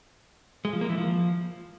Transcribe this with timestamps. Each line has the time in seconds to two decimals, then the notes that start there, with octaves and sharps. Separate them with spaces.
0.65 G#3
0.73 F3
0.81 A#3
0.90 E3
0.98 F3